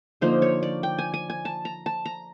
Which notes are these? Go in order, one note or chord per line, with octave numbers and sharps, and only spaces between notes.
D3 F3 A#3 D#4 C5
C#5
D5
G5
G#5
G#5
G#5
A5
A#5
A5
A#5